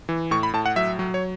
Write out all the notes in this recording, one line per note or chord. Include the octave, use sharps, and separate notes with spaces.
E3
A2 C#6
B5
A2 A5
F#5
F#3 E5
F#3
C#5